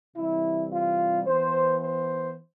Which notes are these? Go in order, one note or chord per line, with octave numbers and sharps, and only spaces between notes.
C3 E3 G3 E4
F4
E3 B3 C5
C5